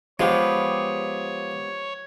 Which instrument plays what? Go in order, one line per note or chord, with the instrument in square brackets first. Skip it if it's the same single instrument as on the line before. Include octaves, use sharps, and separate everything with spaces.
[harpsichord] F3 [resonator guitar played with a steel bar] G#3 B3 G4 [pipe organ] C#5